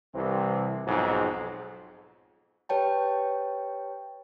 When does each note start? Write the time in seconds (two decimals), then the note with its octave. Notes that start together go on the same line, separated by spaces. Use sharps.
0.15 C2 C3 E3 C4
0.85 B1 F2 G#2
2.69 G4 B4 C#5 G5 A5